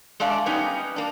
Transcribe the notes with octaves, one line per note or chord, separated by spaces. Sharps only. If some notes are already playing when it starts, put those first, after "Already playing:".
G#3 A3 D4 D5 F5
G3 B3 C#4 D#4
A#3 D4